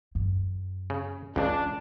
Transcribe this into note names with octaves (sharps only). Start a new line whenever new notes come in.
F#2
C#3
C#2 C#3 E3 C#4 D4